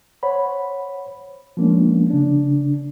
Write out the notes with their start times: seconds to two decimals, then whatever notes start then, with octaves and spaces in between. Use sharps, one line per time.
0.23 C5 C#5 F#5 B5
1.57 F3 G#3 A#3 B3 C#4 D4
2.10 C#3 D4